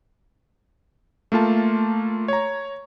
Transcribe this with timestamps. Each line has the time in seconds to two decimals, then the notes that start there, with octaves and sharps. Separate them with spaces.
1.32 A3 A#3 F4 A5
2.28 C#5 A#5